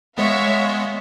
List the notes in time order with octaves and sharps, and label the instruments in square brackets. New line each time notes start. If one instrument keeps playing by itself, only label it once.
[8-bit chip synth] G#3 B3 [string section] C#5 E5 F5